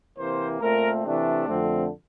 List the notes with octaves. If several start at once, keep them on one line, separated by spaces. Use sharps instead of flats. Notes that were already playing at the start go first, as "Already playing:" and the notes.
C3 E3 A#3 C5
A#2 A3 C4 A#4
C3 E3 A3 D4
F2 D3 A3 C4